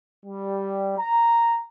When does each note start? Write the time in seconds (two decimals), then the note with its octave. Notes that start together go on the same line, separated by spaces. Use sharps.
0.24 G3
0.98 A#5